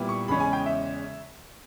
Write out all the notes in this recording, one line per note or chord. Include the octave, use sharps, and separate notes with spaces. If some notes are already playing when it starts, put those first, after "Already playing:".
Already playing: A#2 G3 B3 E4
C#6
E2 C#3 G#3 C#4 B5
G#5
G5
E5